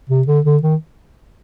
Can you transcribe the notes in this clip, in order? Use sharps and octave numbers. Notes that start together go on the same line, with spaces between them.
C3
D3
D3
D#3